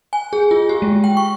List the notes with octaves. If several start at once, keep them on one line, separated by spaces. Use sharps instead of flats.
G#5
G#4
F4
G4
G#3
G5
C#6